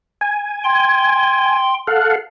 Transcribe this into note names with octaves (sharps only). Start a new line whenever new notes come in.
G#5
G5 C6
A4 F5 F#5